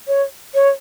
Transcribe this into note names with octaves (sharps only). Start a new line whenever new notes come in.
C#5
C#5